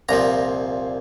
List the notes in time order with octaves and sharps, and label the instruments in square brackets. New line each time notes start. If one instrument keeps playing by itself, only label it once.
[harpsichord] C2 A#2 F3 A#5